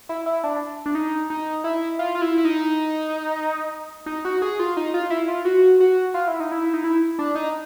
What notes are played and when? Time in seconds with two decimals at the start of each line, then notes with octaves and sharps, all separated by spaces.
0.09 E4
0.26 E4
0.44 D4
0.86 D4
0.95 D#4
1.30 D#4
1.64 E4
1.99 F4
2.15 F4
2.22 E4
2.38 E4
2.45 D#4
4.06 D#4
4.25 F#4
4.42 G#4
4.59 F4
4.77 D#4
4.94 F4
5.10 E4
5.28 F4
5.45 F#4
5.80 F#4
6.14 F4
6.28 E4
6.40 D#4
6.52 E4
6.74 D#4
6.84 E4
7.19 D4
7.36 D#4